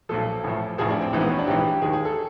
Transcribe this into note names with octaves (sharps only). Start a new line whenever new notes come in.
B1 A#2 F3 A4
A1 A2 F3
A1 A2 F3 G#4
D4
C4
A#1 G#2 E3
B3
C#4
D4
A#1 G#2 E3 G4
D#2 D#3 G#4
G#4
A4